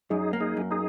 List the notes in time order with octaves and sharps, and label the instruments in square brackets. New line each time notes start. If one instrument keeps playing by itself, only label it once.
[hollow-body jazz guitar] F#2 [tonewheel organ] D#4 G#4
[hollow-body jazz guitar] A#3
[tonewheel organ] D#4 G#4
[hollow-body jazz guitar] F#2
[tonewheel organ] D#4 G#4